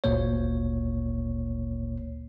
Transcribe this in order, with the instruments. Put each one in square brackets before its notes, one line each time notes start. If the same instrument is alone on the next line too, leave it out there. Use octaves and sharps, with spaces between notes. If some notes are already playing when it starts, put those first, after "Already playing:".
[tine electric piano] G1 D2 A#2 A#3 C#5